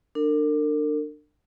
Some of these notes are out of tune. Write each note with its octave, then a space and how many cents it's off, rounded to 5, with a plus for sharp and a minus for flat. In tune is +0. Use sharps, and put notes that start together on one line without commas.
D4 +25 A#4 -40